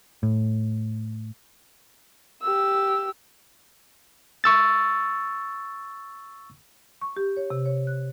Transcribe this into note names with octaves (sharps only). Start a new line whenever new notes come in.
A2
G4 E6
C#6 E6 A6
C#6
G4
C#5
C3
C#5
F#6